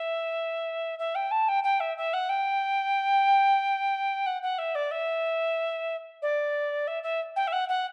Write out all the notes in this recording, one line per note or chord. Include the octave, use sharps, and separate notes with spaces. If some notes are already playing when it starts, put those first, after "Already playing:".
Already playing: E5
E5
G5
A5
G5
G5
E5
E5
F#5
G5
F#5
F#5
E5
D5
E5
D5
E5
E5
G5
E5
F#5
F#5